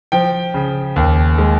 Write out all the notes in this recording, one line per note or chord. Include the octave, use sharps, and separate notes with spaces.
F3 G5
C#3
D#2
G#3